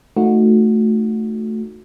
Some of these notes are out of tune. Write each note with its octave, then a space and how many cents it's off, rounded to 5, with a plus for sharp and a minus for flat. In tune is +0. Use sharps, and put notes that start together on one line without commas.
A3 +0 D#4 +0 F#4 -20